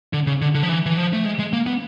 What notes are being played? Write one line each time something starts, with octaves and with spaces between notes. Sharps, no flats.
D3
C#3
D3
D3
F3
E3
E3
F3
A3
G#3
G#3
A#3
B3